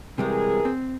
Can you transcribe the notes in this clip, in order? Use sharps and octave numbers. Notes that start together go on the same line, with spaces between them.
C3 E3 G3 G#3 G#4 A#4
C4